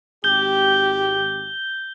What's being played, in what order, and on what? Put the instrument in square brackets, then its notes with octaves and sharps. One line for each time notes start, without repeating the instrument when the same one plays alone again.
[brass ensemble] G#1 G4 [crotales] G6 G7